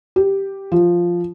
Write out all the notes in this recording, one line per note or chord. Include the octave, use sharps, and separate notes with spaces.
G4
F3